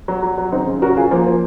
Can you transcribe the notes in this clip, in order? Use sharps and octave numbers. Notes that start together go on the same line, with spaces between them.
F#3
F#3
F#3
C#3 C4 D#4
C#3
F#3 F#4 A#4
F#3 F4 G#4
F3 A#3
F3